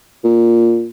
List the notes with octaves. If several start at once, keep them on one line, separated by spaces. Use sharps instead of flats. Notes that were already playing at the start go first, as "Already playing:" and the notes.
A#2